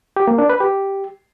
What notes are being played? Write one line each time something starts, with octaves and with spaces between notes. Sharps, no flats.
G4
A#3
D4
B4
G4